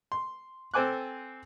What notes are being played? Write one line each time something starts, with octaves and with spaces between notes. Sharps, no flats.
C6
C4 A4 C5 G#5 D6 F#6